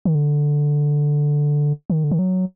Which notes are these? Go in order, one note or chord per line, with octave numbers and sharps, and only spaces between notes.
D#3
D3
D#3
D3
D#3
F#3